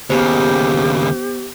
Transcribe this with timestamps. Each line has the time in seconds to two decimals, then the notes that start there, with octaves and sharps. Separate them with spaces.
0.10 D#2 C#3 B3 G4 C5